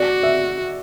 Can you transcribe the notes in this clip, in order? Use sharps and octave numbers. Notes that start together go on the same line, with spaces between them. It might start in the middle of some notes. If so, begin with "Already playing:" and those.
Already playing: F#4 D5
E5